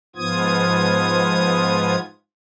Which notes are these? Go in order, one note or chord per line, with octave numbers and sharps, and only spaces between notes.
G#2 F3 B3 F4 D#6 G#6